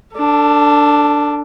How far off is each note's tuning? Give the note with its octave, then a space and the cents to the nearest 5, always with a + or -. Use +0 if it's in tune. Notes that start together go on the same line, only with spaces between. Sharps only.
D4 +0 A4 +35